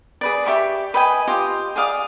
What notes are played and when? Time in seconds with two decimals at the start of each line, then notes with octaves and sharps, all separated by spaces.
0.21 G#4 B4 D5
0.46 G4 E5 C#6 D6
0.94 B4 D#5 G5 G#5
1.27 F4 G4 D#5
1.76 G#4 D5 F5 D#6